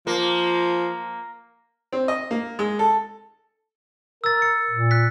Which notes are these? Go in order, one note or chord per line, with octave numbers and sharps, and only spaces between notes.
F3 A#3
C4
D#5
A#3
G#3
A4
A#4 E6 A6
C#7
A#2
F#6 B6